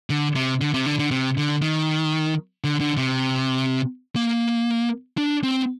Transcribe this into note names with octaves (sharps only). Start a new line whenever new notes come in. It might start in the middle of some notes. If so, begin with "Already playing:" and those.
D3
C3
D3
C3
D3
D3
C3
D3
D#3
D3
D3
C3
A#3
D4
C4